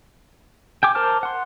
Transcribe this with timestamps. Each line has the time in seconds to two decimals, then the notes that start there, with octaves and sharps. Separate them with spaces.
0.83 G5 G#5 D6
0.95 A#4 C5 A5 D6 F6
1.23 F#5 C6